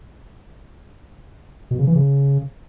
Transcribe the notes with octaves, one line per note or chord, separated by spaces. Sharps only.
B2
C#3
E3
C#3